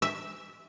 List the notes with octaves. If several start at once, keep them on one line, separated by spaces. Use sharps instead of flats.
E5